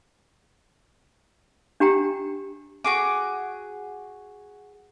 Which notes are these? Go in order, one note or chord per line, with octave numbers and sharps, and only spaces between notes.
D4 G4 G5 A#5
F#4 G#4 D6